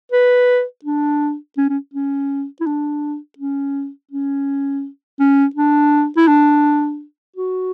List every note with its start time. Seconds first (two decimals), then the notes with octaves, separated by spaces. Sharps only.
0.12 B4
0.84 D4
1.57 C#4
1.69 C#4
1.94 C#4
2.60 E4
2.66 D4
3.38 C#4
4.11 C#4
5.20 C#4
5.56 D4
6.17 E4
6.27 D4
7.36 F#4